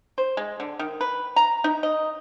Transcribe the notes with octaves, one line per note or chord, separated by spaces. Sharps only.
C5
G#3
D3
D#3
B4
A#5
D#4
D#5